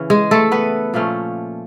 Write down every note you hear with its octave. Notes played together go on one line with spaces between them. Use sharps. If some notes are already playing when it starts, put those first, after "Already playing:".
Already playing: C#3 E3 C#4
G#3 G#4
A3 A4
B3 B4
A#2 F3 A3 C#4